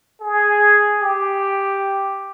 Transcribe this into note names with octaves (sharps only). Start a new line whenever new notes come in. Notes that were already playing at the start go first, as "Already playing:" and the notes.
G#4
G4